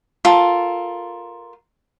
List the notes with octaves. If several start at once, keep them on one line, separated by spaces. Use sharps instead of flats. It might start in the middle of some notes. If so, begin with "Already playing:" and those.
F4 A4 A#4